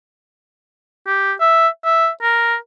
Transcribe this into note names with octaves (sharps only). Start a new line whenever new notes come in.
G4
E5
E5
A#4